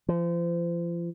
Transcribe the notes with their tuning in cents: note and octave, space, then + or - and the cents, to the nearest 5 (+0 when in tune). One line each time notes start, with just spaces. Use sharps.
F3 -35